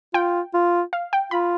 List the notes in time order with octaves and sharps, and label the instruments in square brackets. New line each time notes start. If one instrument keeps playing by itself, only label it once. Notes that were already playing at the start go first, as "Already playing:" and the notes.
[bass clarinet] F4 [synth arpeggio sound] G5
[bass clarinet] F4
[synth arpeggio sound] F5
G5
[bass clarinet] F4 [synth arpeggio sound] B5